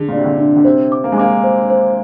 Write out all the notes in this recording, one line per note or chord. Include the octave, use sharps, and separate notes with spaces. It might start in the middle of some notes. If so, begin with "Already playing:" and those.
Already playing: D3 G#4
A#2
D5
C3
D3
D4
D3
C3 C5
D6
A#3
G#3
A#3 D6
C5
C5